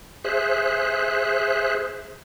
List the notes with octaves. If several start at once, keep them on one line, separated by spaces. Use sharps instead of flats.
G#4 C5 E5 F#6